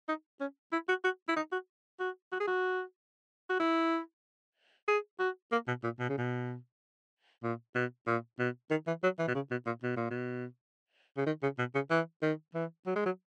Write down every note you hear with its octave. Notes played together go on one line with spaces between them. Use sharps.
D#4
C#4
E4
F#4
F#4
E4
D#4
F#4
F#4
F#4
G#4
F#4
F#4
E4
G#4
F#4
A#3
B2
A#2
B2
C#3
B2
A#2
B2
A#2
B2
D#3
E3
F#3
E3
B2
C#3
B2
A#2
B2
A#2
B2
C#3
D#3
C#3
B2
C#3
E3
D#3
E3
F#3
G#3
F#3